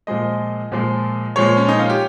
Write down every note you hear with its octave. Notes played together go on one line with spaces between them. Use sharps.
A#2 F3 G#3 D#5
A#2 F3 G#3
A#2 F3 G#3 C#5
C#4
D#4
F4
G4